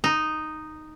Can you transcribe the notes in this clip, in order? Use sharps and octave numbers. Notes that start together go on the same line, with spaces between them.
D#4